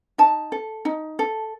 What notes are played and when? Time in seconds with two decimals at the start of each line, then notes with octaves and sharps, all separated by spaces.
0.18 D#4 A5
0.52 A4
0.85 D#4
1.19 A4